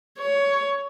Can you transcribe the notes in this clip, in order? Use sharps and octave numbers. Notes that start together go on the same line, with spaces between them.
C#5